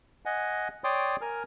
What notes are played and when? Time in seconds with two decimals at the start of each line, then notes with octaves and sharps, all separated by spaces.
0.26 D#5 F#5 G#5
0.84 C#5 D5 G5 C6 D6 D#6
1.21 A#4 G#5 F6